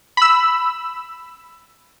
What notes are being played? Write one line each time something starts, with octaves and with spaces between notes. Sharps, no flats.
B5 E6